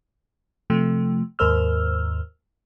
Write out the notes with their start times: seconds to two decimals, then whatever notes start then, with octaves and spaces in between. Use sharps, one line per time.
0.70 C3 F3 A3
1.39 D#2 G#2 A#4 C5 E6 F6